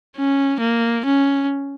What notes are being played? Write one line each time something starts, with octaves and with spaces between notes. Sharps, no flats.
C#4
A#3
C#4